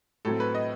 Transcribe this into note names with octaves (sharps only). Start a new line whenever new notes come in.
A2 F#3 C4 A4
B4
D#5